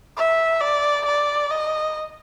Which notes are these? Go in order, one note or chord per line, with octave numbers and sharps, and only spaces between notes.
E5
D5
D5
D#5